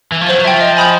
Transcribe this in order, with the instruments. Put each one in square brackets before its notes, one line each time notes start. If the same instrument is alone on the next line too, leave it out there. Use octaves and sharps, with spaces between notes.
[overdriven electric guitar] E3
F3
[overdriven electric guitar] F#3 [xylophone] C5
[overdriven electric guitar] F#3
[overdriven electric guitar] F3 [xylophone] E5 G5
[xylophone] D#5
G#5 B5 D#6 G6